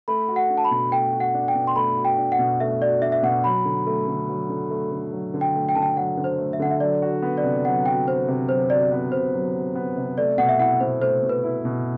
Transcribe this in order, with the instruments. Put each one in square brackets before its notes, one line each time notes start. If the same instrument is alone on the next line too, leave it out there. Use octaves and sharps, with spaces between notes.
[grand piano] A3 [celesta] B5
[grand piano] F#4
[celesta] F#5
[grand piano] D4
[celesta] A5
B5
[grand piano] B2
[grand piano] A3 [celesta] G5
[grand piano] F#4
[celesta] F#5
[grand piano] D4
[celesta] G5
[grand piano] B2
[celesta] C6
[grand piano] A3 [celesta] B5
[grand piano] F#4
[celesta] G5
[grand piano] D4
[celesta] F#5
[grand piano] B2
[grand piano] A3 [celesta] E5
[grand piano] F#4 [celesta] D5
[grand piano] D4 [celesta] E5
[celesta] E5
[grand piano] B2 [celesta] F#5
[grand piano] F#3 [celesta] B5
[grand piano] D3
A3
D3
F#3
D3
A3
D3
F#3
D3
[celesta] G5
[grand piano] A3
[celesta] G5
[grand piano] D3 [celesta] A5
[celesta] G5
[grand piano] F#3 [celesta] F#5
[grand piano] D3
[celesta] C5
[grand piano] A3
[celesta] E5
[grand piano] D3 [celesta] F#5
[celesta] E5
[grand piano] F#3 [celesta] D5
[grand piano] F#4
B3
[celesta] D5
[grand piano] C3
[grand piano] F#3 [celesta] F#5
[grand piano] F#4 [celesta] G5
[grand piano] B3 [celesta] C5
[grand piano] C3
[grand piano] F#3 [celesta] C5
[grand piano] F#4 [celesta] D5
[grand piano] B3
[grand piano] C3 [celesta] C5
[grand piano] F#3
F#4
B3
C3
[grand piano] A3 [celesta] D5
[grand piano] B2 [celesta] F#5
[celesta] E5
[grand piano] E4 [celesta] F#5
[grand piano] B2 [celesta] C5
[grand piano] A3 [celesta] C5
[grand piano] B2
[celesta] B4
[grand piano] E4
B2